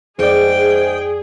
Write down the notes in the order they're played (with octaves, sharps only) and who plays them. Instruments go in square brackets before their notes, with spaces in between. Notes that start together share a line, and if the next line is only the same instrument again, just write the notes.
[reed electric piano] F2 D5 [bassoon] G#2 [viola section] G#4 [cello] G5